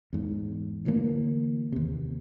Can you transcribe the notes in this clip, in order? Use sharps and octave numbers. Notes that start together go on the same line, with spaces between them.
E2 G#2
D2 D3 E3 A#3
D#2 C3